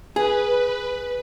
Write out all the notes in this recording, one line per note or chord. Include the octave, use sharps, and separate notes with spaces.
G#4 B4